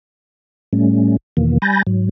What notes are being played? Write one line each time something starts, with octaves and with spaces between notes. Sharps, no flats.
A2 G3 A3 C#4
E2 B2 D#3 E3 A#3
G3 G#5 B5 G6 A6 A#6
G#2 F#3